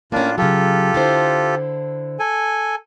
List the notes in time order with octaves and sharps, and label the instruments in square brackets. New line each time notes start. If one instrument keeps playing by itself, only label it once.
[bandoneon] A2 D4 F4 [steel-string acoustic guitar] A#3 C#4
[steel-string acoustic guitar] C#3 F#3 [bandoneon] F4 G4 A4
[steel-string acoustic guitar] D3 E4 C5
[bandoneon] A4 G#5